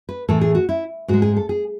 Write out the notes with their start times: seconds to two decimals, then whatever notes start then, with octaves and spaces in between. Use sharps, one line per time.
0.09 B4
0.28 A2 E3 A3 A4
0.41 G#4
0.55 F#4
0.69 E4
1.08 G#2 G#3 F#4
1.22 G#4
1.36 A4
1.49 G#4